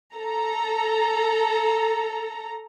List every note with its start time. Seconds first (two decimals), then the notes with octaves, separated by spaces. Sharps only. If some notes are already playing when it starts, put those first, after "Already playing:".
0.16 A4 A#5